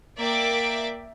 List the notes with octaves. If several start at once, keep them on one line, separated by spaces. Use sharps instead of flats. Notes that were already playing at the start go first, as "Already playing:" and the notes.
A#3 D5 E5 G5 D6